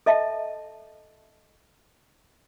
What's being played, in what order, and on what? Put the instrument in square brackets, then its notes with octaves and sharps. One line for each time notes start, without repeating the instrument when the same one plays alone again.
[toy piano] A4 D#5 E5 A5